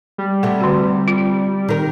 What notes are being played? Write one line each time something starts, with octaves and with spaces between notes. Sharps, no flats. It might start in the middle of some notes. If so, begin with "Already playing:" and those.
G3
C3 A3 F#5
D3 F#4
F4
D#3 A#4